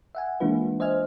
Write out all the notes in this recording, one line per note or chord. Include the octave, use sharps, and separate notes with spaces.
E5 F#5 G#5
E3 G#3 A#3 D4 F4 B4
C5 D#5 E5 G#5 F6